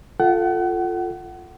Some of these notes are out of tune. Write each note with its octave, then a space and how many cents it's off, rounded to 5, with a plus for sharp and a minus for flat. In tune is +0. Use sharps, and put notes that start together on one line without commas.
F4 +0 A4 +0 F#5 +35